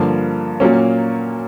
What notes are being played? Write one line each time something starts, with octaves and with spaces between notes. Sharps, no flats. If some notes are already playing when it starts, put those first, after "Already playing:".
Already playing: G2 D3 F3 A#3
A#2 F#3 A#3 C#4